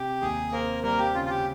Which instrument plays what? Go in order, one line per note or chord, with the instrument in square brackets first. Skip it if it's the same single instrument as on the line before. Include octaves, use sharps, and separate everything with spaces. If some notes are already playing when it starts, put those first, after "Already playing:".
Already playing: [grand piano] C3 [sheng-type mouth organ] G4
[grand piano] D#2 [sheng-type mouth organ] G#4
[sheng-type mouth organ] A#3 A#4 [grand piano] C4
[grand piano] G3 [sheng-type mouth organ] A#3 A#4
[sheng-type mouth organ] G4
[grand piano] C#3 [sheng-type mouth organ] F4
[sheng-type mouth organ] F4
G4